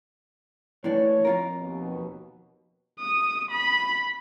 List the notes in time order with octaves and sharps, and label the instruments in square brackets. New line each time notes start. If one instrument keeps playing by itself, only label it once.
[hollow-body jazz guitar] A2 E3 D4 [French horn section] C#5
[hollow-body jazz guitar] F2 F4 A#4
[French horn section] D#2 B2
[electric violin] D#6
B5